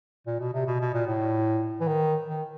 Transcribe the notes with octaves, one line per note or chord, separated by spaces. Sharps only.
A#2
B2
C3
B2
B2
A#2
A2
E3
D#3
D#3